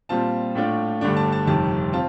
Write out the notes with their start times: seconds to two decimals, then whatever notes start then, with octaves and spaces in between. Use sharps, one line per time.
0.09 A#2 G3 C4 F4 A5
0.55 A2 A3 D4 F4
1.01 G1 G2 D3 A3 D4
1.16 A5
1.32 A5
1.47 G1 F2 C3 D#3 A5
1.93 C4 F4 A5